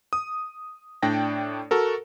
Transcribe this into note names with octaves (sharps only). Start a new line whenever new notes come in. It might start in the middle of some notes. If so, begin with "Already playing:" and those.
D#6
A2 D4 D5 G5 A#6
F#4 A4 A#4